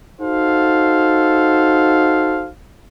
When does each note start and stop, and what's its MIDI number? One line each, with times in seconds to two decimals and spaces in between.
0.21 2.49 63
0.21 2.49 66
0.21 2.49 69
0.21 2.49 72
0.21 2.49 77